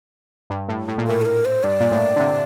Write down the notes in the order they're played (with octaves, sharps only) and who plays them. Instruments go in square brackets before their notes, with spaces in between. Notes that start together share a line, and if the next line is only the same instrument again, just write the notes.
[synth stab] G2
A2
A2
A#2
[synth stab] A2 [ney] A#4
[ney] A4
A#4
C5
[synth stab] G2 [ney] D5
[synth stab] A#2
A2
D3
C3